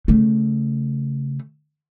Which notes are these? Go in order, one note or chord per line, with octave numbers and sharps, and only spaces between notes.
C#3 A3